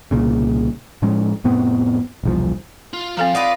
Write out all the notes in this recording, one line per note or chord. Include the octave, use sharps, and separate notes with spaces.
C2 A#2 C#3
A2 F3 G#3 C#4
F1 A2 B3 C4
E1 C2 F3
F4
F3 C4 A4 F5 A#5
D#4 F4 B4 D5